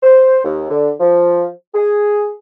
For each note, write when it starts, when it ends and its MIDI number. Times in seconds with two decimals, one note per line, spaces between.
0.03 0.39 72
0.45 0.67 39
0.70 0.91 50
1.00 1.46 53
1.75 2.30 68